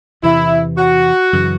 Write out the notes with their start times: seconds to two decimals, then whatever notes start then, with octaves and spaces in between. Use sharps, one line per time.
0.23 E2 C3 E3 E4
0.78 F#4
1.33 F#2 C#3 E3